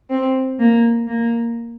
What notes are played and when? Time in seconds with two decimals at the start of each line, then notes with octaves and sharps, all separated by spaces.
0.10 C4
0.58 A#3
1.08 A#3